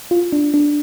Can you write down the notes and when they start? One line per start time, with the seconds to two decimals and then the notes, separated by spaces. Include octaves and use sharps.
0.11 F4
0.32 D4
0.54 D4